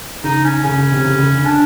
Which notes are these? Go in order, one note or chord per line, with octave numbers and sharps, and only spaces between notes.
C#3 D#4
C#4
C#3 C#4
C#3
C3
C#3
C#3
D3
D4